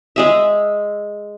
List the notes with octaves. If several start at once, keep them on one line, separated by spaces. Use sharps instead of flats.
G#3 G#4 E5